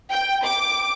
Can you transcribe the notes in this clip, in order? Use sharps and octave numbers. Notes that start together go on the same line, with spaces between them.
G5
D6